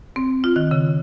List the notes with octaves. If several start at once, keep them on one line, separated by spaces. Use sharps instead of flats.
C4
F4
D#3
C#3